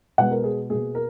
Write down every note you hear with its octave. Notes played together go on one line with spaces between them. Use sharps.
B2 G#3 B3 F#5
A#4
G#4
B2 A#3 G#4
A#4